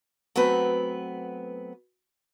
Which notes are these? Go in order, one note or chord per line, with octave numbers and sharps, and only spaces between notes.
F#3 A3 B3 C4 B4